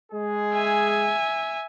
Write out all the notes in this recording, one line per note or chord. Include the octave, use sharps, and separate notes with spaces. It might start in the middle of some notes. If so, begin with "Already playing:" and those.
G#3 G#4
E5 G#5